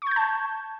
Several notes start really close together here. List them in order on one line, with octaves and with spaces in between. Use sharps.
C#6 G6 G#6 A5